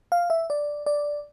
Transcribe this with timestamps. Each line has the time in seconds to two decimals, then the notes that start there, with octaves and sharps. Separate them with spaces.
0.12 F5
0.30 E5
0.50 D5
0.86 D5